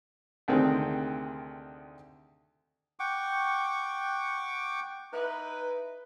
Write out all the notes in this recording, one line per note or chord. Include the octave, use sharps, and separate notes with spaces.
D2 C3 D#3 G#3 C4
F#5 G5 C#6 D6
D#4 E4 B4